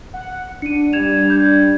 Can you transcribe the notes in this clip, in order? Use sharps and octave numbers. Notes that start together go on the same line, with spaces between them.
F#5
D4 C#7 D#7
G3 G#6 E7 F7
G6 G#6